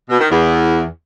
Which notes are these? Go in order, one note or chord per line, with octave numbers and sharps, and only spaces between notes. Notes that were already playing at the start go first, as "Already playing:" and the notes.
B2
D#3
E2